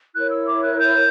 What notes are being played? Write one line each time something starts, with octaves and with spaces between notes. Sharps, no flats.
E4 A#4 C#5 F#6
E6
D6
F#6
G6